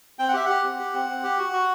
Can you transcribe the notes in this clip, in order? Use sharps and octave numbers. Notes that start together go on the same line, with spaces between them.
C4 G5
F#5
G4 E5
G4 F#5
C4
G4
C4
C4
G4
F#4
F#4